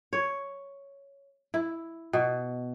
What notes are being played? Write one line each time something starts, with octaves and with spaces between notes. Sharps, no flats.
C#5
E4
B2